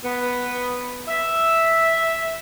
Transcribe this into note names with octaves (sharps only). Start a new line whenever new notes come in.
B3
E5